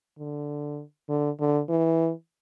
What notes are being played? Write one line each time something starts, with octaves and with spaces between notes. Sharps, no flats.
D3
D3
D3
E3